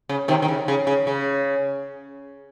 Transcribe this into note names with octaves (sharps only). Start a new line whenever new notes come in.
C#3
C3 D#3
D#3
C#3
C#3
C#3
C#3